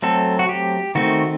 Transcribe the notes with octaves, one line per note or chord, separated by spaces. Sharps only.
F#3 A3 C4 A4
F#4
G4
D#3 A3 C4 F#4